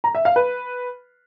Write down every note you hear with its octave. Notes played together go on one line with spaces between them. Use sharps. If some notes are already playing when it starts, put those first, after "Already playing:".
A#5
E5
F5
B4